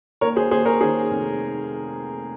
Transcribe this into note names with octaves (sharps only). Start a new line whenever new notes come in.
D#2 A#4 C#5
G#4 C5
D#2 G#4 C5
A#4 C#5
D#3 G#4 C5
F1